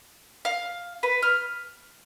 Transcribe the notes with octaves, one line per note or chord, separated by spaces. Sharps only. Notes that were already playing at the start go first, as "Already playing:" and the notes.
F5
B4
F6